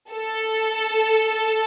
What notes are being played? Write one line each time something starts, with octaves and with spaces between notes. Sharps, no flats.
A4